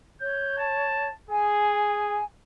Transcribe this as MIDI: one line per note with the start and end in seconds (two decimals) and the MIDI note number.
0.21 1.09 73
0.21 0.57 91
0.58 1.12 81
1.30 2.20 68
1.30 2.24 80